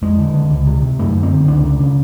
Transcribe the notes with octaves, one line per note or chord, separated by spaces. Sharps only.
F2 G#3
D3
D3
C#2
C3
C3
F#2 A3
D3
C4
D3
C#2 D4
C#3
C#3